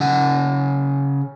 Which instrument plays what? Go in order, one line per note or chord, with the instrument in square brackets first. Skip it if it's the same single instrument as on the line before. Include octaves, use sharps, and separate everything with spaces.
[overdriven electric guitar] C#3 F#5